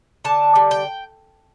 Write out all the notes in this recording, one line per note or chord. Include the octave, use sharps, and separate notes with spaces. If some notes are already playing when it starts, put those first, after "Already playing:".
D3 A5
G3
G5